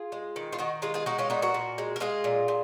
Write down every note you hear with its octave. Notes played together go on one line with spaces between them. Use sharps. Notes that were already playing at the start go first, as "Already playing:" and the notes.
Already playing: F4 G#4
G#3
D#3
F4
D#3 D#4 F#4
G#3 F4 G#4
F4 G#4
G#3 D#4 F#4
C#4 F4
A#2 D#4 F#4
F#4 A#4
A#2
G#3
A#4
G#3 F4 G#4
A#2
A#2